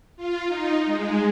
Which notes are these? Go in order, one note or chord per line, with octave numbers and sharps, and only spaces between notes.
F4
D#4
G#3